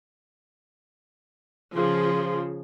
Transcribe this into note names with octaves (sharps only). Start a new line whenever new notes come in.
C#3 F3 G#4 C6